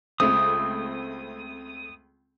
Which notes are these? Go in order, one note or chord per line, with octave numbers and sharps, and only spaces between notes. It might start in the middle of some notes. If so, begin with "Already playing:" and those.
C#2 A3 C4 D#6